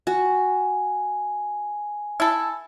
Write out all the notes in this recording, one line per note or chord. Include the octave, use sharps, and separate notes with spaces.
F#4 G#5
E4 A4